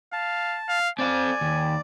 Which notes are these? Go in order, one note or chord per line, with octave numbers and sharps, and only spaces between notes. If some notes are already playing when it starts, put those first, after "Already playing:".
F5 A5
F5
C4 D5 F5 G#5
D#2